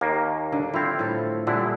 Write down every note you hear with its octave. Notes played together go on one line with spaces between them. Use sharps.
D#2 A#3
D3
F3 C4 E4 F5
A2 A4
A#2 D3 G3 E4 G#4